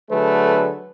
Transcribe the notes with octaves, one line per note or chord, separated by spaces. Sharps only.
D3 F#3 A3 G#4 B4